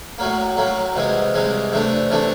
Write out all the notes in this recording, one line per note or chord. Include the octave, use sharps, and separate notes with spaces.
A2 F#3 A#3
A2 F#3 A#3
C2 C3 E3 G#3
C2 C3 E3 G#3
C3 E3 A3 D4
C3 E3 A3 D4